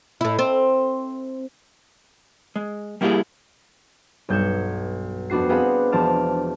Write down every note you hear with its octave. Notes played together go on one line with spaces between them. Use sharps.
A2 E4
C4
G#3
G3 A#3 E4 F4 G4 G#4
B1 G2 G6 G#6 C#7 E7
F2 B3 D4 F#4 C7
B3 C4 G#4 F5 F#5 B5
E1 F3 C5 A5 F6 D7